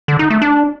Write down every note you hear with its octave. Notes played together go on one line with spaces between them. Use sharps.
D3
D#4
A3
D4